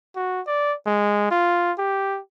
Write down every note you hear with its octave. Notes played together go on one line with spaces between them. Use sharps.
F#4
D5
G#3
F4
G4